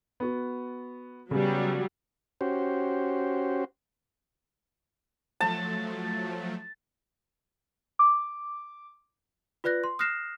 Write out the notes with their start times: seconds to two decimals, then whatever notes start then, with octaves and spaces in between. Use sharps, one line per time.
0.20 B3 F#4
1.31 C#3 F#3 G3 B3
2.41 C#4 F#4 G4 C5
5.41 F3 F#3 A3 A5
7.99 D6
9.64 F4 B4 D5 F#6 A#6
9.84 C6
9.99 D#6 F6 F#6 A#6 C7 E7